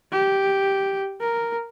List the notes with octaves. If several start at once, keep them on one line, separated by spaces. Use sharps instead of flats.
G4
A#4